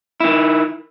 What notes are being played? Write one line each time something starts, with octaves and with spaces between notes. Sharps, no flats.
D#3 E4